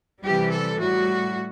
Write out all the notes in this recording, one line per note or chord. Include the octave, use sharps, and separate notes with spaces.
C3 E3 G3 G4
A4
A2 G3 F#4